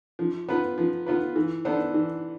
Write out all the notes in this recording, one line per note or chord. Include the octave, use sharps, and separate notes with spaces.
F3
B3 F4 B4
F3
B3 F4 B4
E3
B3 D4 A4 C5
E3